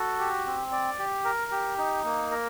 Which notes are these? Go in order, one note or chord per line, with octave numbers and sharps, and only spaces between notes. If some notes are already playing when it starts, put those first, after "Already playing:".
Already playing: F#4 A4
G4
C4
D5
G4
A#4
G4
D#4
A#3
A#4